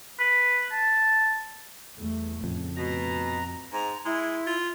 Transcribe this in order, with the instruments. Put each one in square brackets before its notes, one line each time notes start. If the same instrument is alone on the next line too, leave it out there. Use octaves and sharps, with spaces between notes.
[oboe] B4
A5
[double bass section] E2 G3 A3
[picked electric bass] F2 [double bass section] A2 C#3
[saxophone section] B2 [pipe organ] A#5
[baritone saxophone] G#2 [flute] A#5
[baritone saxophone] G#3 [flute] E4
[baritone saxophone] F4